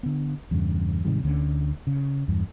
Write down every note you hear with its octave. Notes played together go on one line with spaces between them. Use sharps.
D3 B3
E2 G2 C#3
G#2 C3 D#3 G3
D2 D3 D#3 C#4
C#3
E2 G2